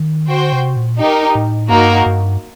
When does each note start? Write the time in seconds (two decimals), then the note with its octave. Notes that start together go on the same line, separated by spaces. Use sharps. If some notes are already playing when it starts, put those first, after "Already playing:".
Already playing: D#3
0.28 D3 F#4 C5 G5
0.53 C3
0.76 A#2
1.00 D#4 G4 A#4
1.35 A2
1.70 G2 A#3 D#4 F#4 A#4
2.06 G2